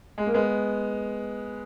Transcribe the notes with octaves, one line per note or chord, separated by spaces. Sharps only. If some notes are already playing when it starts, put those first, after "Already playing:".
G#3
A#3
G#3 B3